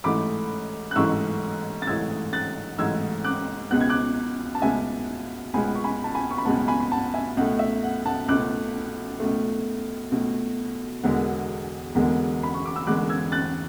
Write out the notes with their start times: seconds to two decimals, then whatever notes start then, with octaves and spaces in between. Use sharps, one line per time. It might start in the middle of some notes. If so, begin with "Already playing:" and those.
0.04 A1 G#2 E3 A3 B5 D6
0.91 F#6
0.95 A1 G#2 E3 A3 C#6 E6
1.82 A6
1.87 A1 G#2 E3 A3 E6 G#6
2.33 F#6 A6
2.78 A1 G#2 E3 A3 E6 G#6
3.24 D6 F#6
3.71 C#2 B2 G#3 B3 F#6
3.80 G#6
3.90 D6 F#6
4.55 A5
4.62 C#2 B2 G#3 B3 E5 G#5
5.54 C#2 B2 G#3 B3 G#5 B5
5.75 C#6
5.84 G#5 B5
6.04 A5
6.15 G#5 B5
6.30 C#6
6.38 B5
6.45 C#2 B2 G#3 B3 F#5 A5
6.68 G#5 B5
6.80 B5
6.91 F#5 A5
7.14 E5 G#5
7.37 C#2 B2 A3 F#5
7.59 E5
7.83 F#5
8.06 F#5 A5
8.28 C#2 B2 A3 D6 F#6
9.20 C#2 B2 A3
10.12 C#2 B2 A3
11.03 E1 E2 D3 G#3 B3
11.95 E1 E2 D3 G#3 B3
12.43 B5
12.54 C#6
12.65 D6
12.76 E6
12.87 E1 E2 D3 G#3 B3 D6 F#6
13.09 E6 G#6
13.32 F#6 A6